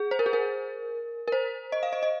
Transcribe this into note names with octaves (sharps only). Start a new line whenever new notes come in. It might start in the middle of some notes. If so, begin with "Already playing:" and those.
Already playing: G#4
C5
A#4
G#4
A#4
A#4
C5
D#5
F5
D#5
D#5